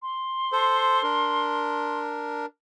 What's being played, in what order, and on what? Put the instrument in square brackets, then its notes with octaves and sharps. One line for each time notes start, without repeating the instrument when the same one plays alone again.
[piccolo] C6
[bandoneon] A4 C5
D4 A#4